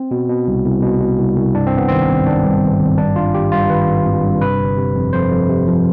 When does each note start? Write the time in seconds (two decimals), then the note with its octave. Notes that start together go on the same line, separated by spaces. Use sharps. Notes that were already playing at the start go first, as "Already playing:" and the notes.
Already playing: C4
0.11 B2
0.29 B2
0.47 C2
0.65 C2
0.83 B2
1.01 B2
1.19 C2
1.37 C2
1.55 G2 D4
1.66 C4
1.73 G#1 B3
1.88 D#3 C4
2.09 G#1
2.26 D#3 D4
2.44 G2
2.62 G#1
2.80 G#1
2.98 G2 D4
3.16 G2 F4
3.34 G#1 G4
3.52 G2 F4
3.70 D#3 B4
3.88 G#1
4.06 G#1
4.23 G2
4.41 C3 B4
4.60 G1
4.77 C3
4.95 F2
5.13 F2 C5
5.31 F2
5.49 C3
5.67 F3